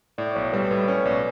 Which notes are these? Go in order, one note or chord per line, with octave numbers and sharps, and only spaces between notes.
A2 D5
D5
B1 C#5
G3 B4
A2 B4
C#4 C#5
B1 D5